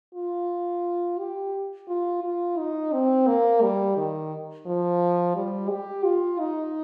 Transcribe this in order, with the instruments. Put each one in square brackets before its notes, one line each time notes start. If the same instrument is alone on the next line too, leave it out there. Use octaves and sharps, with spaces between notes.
[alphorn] F4
G4
F4
F4
D#4
C4
A#3
G3
D#3
F3
G3
G4
F4
D#4